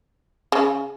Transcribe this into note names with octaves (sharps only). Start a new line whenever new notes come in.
C#3